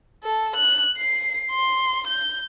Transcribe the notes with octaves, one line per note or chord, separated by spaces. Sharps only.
A4
F#6
C7
C6
G6